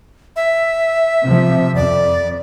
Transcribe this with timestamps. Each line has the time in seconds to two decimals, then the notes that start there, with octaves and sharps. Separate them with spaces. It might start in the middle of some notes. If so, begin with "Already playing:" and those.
0.36 E5
1.25 C3 F3
1.75 F2 D5